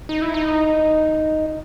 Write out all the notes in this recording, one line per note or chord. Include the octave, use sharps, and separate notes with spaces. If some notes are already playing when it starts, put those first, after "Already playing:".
D#4
E4
D#4